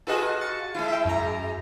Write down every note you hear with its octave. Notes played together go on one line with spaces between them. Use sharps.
F4 F#4 G#4 A4 B4 D#5
A6 C#7
G#3 E4
E5 G5
F#2 A#5